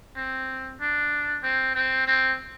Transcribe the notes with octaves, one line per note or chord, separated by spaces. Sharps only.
C4
D4
C4
C4
C4